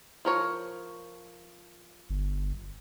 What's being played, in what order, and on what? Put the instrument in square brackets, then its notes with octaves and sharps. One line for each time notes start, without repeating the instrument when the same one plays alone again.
[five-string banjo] F3 A#4 C#5
[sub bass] G1